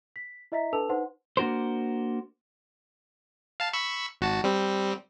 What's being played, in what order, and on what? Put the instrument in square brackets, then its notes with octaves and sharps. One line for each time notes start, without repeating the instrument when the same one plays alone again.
[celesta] B6
E4 D#5 E5 A#5 B6
D4 A4 B4 A5 E6 F7
D#4 B4 C5 F#5 C6
[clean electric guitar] A#3 D4 F#4 A#4 C5
[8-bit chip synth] F5 A5
B5 C#6 E6
G#1 F#4 A5
G3 C4